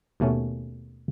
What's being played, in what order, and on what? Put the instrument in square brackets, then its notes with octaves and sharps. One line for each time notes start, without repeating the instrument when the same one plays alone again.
[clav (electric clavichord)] D#2 B2 A3 C#4